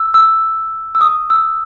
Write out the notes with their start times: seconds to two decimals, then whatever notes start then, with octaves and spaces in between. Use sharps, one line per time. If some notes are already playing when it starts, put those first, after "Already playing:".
Already playing: E6
0.14 E6
0.95 E6
1.01 D#6
1.30 E6